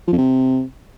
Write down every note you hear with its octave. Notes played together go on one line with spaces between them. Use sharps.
F3
F2
C3